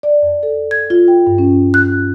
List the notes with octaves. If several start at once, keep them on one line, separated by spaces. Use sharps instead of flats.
D5
F2
A4
G#6
F4
G5
G2
C#4
F#6